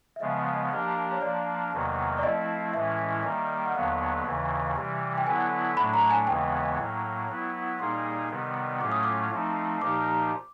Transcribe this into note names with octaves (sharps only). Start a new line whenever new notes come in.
E5
C#3 F3 G#3 B3 D#5
F3 A#3 D4 G4 A#4
C#5
F3 A#3 D4 D5
E2 C3 D#3 F#3 A#3
D5
F3 A3 C4 E4 D#5
A2 E3 G#3 C#4 E4 E5
D#3 G3 A#3
F#5
D#2 D3 F#3 B3 F5
D#2 C#3 E3
C3 E3 G3
G5
D3 F#3 B3 E4 G#5
A2 F#3 A3 D4 B5
A#5
G#5
D#2 C#3 E3 G#3 B3 G5
A2 F#3 A#3
F#3 B3 E4
A#2 G3 A#3 D#4 G#4 C6
C3 D#3 G3 B3
A2 F#3 A3 C#4 F4 D6
D#6
D6
F3 A3 C4 D#4
A#2 F3 A#3 D#4 G4 D6